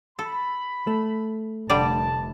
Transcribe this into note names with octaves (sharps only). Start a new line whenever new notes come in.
A4 B5
A3
F1 D3 G3 D5 A5